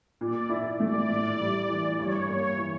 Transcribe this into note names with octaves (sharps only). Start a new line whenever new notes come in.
A#2 D5
E4
A3 D5
A2
G3
E3
G2 C#5
A#3 C#5
E3